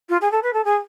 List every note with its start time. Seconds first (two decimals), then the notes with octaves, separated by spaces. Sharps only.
0.09 F4
0.21 G#4
0.31 A4
0.43 B4
0.53 A4
0.65 G#4